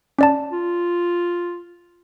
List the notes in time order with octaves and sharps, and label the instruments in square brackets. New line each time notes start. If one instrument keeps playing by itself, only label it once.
[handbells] C#4 D5 A5
[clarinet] F4